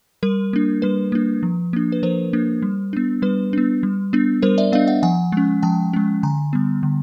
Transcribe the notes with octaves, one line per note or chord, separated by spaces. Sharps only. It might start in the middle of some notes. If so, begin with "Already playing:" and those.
G3 A#4
A#3 D4
G3 B4
A#3 D4
F3
A#3 D4
B4
F3 A#4 C5
A#3 D4
G3
B3 D4
G3 B4
B3 D4
G3
B3 D4
G3 A#4 C5
D5 E5
B3 D4 D#5 F5
E5 F#5
F3 F#5 G#5
G#3 C#4
F3 G5 A5
G#3 C#4
D3 G#5 A#5
G3 B3
D3